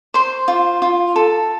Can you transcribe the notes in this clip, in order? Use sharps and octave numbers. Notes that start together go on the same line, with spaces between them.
C5 C6
F4
F4
A4